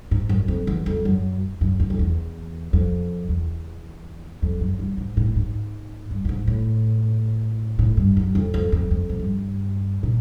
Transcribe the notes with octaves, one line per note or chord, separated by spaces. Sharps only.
G#2
F#2
F2
E2
F2
F#2
F#2
E2
F2
E2
F2
E2
F2
F#2
G2
G#2
A2
G#2
G2
G2
G#2
A2
A2
G2
F#2
F2
F2
F2
F2
G#2
G2
A#2